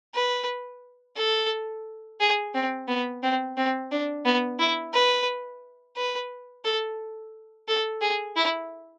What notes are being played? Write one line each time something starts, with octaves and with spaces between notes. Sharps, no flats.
B4
A4
G#4
C4
B3
C4
C4
D4
B3
E4
B4
B4
A4
A4
G#4
E4